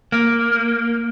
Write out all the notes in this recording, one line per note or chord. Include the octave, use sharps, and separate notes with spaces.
A#3